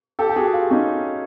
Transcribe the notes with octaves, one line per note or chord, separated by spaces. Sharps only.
G4 A4
G4
F#4 G#4
F4 G4
C#4 D#4